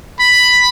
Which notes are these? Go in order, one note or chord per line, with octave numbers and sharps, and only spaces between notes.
B5